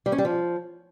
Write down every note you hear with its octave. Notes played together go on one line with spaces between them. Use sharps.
G3
C#4
G3
F3